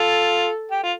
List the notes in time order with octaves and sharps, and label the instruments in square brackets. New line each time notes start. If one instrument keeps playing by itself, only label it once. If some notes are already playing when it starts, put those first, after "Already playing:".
Already playing: [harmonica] F4 [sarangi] A4
[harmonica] G4
F4